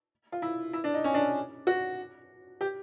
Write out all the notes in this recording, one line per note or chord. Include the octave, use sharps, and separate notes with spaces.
F4
E4
E4
D4
D#4
C#4
D4
F#4
G4